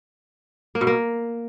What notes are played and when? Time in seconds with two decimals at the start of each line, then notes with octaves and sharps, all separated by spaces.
0.75 A#3
0.81 B2
0.87 A#3